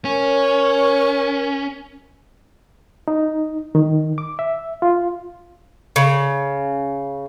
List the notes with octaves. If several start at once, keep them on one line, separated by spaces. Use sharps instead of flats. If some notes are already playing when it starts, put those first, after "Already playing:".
C#4 A#4 C#5
D#4
D#3
D6
E5
F4
C#3